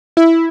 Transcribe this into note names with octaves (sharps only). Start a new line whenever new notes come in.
E4